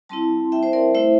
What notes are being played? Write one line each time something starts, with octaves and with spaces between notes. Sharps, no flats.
G3 C4 E4 A5 C6
E5 G5
C5 E5
A#4 D5
A3 E4 C5 E5